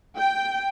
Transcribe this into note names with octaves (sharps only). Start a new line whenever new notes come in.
G5